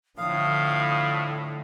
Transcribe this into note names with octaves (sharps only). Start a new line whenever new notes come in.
A2 D3 F3 F5 D#6